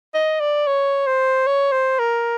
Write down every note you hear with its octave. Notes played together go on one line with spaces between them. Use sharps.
D#5
D5
C#5
C5
C#5
C5
A#4